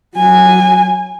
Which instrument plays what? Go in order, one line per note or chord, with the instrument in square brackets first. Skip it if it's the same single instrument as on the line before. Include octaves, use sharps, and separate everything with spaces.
[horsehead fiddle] F#3 G#5